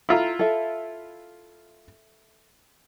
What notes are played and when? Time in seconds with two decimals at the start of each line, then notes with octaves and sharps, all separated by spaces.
0.09 E4 F4 A4 A#5
0.39 A4 E5